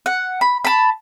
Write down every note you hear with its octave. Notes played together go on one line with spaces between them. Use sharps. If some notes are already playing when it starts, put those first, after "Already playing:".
F#5
B5
A5 B5